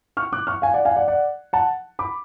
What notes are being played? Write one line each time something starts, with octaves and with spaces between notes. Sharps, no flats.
C#6 F6
D6 F#6
C#6 F6
F5 G#5
D5 F#5
F5 G#5
D5 F#5
D5 F#5
F#5 A5
B5 D6